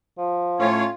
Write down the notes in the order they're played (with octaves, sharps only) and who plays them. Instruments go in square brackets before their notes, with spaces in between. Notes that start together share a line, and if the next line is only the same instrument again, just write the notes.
[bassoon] F3
[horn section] A2 C#4 [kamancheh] F4 [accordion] C#5